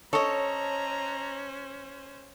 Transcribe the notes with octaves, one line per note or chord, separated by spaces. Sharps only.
C#4 A4 C5 C#5 D#5 A#5